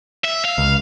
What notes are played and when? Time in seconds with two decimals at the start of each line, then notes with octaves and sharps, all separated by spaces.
0.24 E5
0.44 F5
0.58 C#2